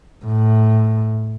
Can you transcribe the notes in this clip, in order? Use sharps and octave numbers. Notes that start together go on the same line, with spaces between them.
A2